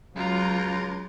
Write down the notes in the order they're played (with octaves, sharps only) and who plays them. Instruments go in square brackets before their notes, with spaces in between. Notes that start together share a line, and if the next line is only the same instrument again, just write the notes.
[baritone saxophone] C#2 [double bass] F#3 [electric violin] F4 A#5